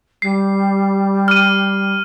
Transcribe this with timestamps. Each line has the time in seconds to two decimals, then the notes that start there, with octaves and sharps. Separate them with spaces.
0.22 G3 C7
1.28 F6 D#7